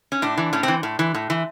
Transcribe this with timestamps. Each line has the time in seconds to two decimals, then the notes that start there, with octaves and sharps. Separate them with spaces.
0.12 C#4
0.22 A2 D4
0.38 E3
0.53 A2 C#4
0.63 E3 C4
0.83 A2
0.99 E3
1.15 A2
1.30 E3